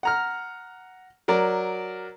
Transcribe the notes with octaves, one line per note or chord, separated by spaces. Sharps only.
F#5 A#5 F6
F#3 A#4 D5